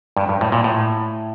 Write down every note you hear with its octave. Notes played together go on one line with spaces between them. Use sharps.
G2
G2
A2
A#2
A2